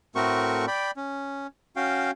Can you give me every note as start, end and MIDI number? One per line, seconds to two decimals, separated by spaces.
0.15 0.66 45
0.15 0.66 57
0.15 0.66 60
0.15 0.66 66
0.15 0.66 70
0.15 0.66 85
0.67 0.91 74
0.67 0.91 79
0.67 0.91 83
0.97 1.47 61
1.76 2.11 61
1.76 2.11 66
1.76 2.11 77
1.76 2.11 79